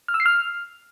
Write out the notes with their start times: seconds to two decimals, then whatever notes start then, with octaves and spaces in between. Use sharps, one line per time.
0.08 F6
0.14 E6
0.20 C7
0.26 F6